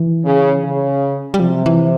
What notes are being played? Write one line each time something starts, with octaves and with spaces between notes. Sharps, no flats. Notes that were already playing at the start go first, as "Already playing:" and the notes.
Already playing: E3
C#3
C#3
G3
C3 F3
E3